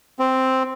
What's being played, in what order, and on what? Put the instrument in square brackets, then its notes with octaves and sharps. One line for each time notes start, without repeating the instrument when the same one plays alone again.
[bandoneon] C4